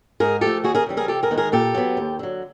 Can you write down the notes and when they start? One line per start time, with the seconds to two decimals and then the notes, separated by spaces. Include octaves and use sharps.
0.20 G#2 G#4 A#4
0.41 F3 A3 G4 A4
0.64 D#2 F#4 G#4
0.75 G#4 A#4
0.86 C#3 E3 G3
0.97 G#4 A#4
1.08 C3 G4 A4
1.23 G#4 A#4
1.31 D#3 G#3 B3
1.38 G#4 A#4
1.52 A#2 G4 A4
1.74 F#3 B3
1.97 D#2
2.19 D3 F#3